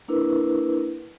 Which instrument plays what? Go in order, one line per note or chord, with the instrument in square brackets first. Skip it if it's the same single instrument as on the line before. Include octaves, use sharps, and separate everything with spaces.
[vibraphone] A#3 D4 E4 A#4 B4